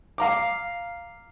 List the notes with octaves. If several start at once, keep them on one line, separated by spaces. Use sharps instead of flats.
F5 A#5 D6